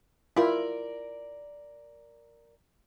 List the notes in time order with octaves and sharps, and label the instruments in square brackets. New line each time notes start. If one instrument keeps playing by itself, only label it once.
[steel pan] E4 F4 [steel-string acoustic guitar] A#4 D5